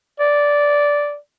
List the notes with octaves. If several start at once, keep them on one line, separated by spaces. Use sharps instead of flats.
D5